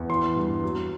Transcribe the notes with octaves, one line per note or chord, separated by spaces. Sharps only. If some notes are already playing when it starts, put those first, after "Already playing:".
Already playing: E2
E3 C6
G2
F#3